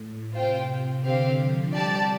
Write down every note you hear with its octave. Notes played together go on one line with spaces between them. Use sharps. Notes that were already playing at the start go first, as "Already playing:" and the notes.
Already playing: A2
C3 F4 C5 G5
D3 C4 G4 F5
F3
G3 G4 D5 A5